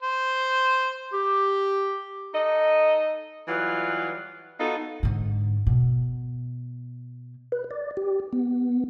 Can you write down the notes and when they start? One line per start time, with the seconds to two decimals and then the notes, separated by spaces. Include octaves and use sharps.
0.03 C5
1.13 G4
2.33 D#4 A4 D#5
3.48 E3 F#3 G3 F4 B4
4.60 B3 D#4 F4 F#4 A4
5.03 G#2 D3
5.67 B2
7.52 B4
7.71 D5
7.97 G4
8.33 B3